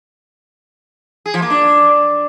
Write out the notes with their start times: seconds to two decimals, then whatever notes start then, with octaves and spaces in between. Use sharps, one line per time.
1.26 G#4
1.34 F3
1.42 A#3
1.50 D4